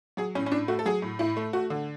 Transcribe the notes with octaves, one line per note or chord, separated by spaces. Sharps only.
F#3 G#4
A2 C#4
C#4
A2 D4
A3 F#4
A4
F#3 G#4
A2
A2 E4
A3
A3 F#4
D3